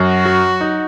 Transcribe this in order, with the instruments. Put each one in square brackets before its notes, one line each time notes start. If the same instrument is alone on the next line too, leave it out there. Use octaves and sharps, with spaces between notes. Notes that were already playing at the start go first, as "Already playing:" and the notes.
Already playing: [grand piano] F#2 [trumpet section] F#4
[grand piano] F#3
D#4